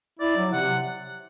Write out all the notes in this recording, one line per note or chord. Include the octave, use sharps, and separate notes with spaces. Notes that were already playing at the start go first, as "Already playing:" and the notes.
E4 D5
F#3
C3 F#5